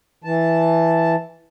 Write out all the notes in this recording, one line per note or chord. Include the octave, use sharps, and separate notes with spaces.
E3 A5